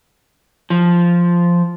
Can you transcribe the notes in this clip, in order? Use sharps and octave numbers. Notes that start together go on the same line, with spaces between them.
F3